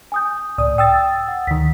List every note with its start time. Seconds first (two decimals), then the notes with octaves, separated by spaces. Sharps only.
0.12 G#5 D#6 G6
0.58 C#2 A2 D5 D#6
0.78 G5 D#6 E6 A6
1.28 F#5
1.47 D2 D#3 B6